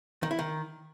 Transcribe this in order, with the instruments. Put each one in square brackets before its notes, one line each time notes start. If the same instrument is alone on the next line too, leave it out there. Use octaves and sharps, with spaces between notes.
[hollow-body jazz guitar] D#3
E4
D#3